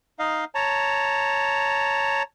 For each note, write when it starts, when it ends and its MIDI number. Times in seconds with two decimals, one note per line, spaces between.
0.19 0.45 63
0.19 0.45 75
0.19 0.45 77
0.55 2.23 73
0.55 2.23 81
0.55 2.23 82